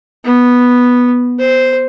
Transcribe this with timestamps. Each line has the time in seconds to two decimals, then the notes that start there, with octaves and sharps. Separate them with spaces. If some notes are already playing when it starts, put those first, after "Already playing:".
0.25 B3
1.39 C5